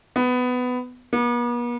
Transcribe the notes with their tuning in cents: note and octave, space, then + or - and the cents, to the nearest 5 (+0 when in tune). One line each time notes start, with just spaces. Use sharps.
B3 +15
B3 -45